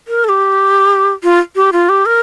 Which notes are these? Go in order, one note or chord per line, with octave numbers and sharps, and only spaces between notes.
A#4
A4
G4
F4
G4
F4
G4
A#4